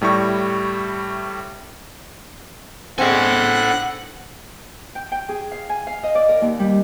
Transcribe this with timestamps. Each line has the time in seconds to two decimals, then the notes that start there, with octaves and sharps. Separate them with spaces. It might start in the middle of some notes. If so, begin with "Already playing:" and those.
0.01 A2 G3 E4 C#6 A#6
2.99 A2 G#3 C4 D4 A4 F#5 G#5
4.95 G5
5.12 G5
5.29 G#4
5.52 F5
5.69 G#5
5.87 F5
6.03 D#5
6.15 D5
6.29 A#4
6.41 D#2
6.59 G3